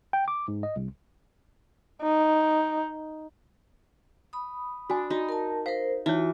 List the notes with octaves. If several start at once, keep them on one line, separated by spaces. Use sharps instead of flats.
G5
D6
G#2
D#5
C2
D#4
B5 D#6
D4 F#4 G#5
D#4 F#4
A#4 A5
A#4 C5 F5
E3 D#4 F4 F#4 C#5